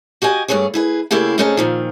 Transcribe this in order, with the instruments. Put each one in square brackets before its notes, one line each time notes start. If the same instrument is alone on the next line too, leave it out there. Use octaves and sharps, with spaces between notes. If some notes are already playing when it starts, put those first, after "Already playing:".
[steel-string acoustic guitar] F#4 G4 D#5 G#5
G2 B2 A3 G#4 C#5
E4 G#4 B4
C#3 A3 A#3 E4 G4 G#4
C3 A3 C#4 D#4 G#4 A5
A#2 D#3 F3